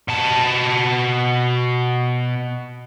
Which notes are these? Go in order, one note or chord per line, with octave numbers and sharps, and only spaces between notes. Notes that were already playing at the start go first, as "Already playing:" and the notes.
B2 A5